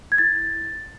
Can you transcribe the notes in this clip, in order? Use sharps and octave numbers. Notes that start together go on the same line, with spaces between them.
G#6
E4 A6